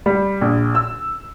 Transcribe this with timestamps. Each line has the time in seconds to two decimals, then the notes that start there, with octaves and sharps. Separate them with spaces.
0.06 G3
0.41 A#1
0.75 E6